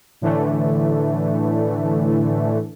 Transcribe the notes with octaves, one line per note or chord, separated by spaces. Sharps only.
A2 D3 E3 A3